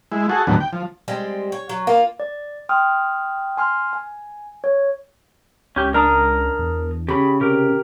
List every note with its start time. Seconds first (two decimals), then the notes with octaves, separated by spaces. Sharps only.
0.12 G#3 E4
0.29 F#4 G#4 A4
0.47 D#2 A2 D3 F#3 B3
0.60 G5
0.73 F3
1.08 G3 G#3 C4
1.52 C#5
1.69 F#3
1.87 A#3 F4
2.20 D5
2.69 G5 C6 D#6 F6
3.57 G#5 C6 F6
3.93 G#5
4.64 C#5
5.76 C#2 C#4 G4
5.94 D4 A#4 A#5 D#6
6.59 E2
7.09 C#3 G4 B5
7.41 C3 G4 A#4